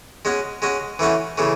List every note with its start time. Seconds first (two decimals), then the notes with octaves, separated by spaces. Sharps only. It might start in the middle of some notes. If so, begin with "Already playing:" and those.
0.25 G#3 C#4 F#4
0.62 G#3 C#4 F#4
0.99 E3 A3 C#4 F#4
1.38 C#3 E3 A3